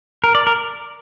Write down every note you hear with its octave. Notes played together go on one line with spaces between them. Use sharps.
A#4
D5
A#4